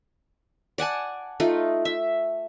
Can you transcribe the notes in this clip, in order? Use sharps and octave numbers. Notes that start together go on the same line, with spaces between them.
D5 F#5 G#5 A5
A3 D#4 F4
E5